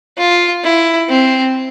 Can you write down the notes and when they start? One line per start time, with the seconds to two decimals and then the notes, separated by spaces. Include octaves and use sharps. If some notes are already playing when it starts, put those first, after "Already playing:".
0.18 F4
0.64 E4
1.09 C4